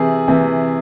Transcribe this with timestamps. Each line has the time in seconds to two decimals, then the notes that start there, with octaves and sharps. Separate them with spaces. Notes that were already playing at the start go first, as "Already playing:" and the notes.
Already playing: C3 E3 G#4
0.28 C3 E3